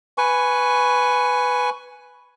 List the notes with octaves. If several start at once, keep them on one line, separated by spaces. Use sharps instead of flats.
B4 G#5 C#6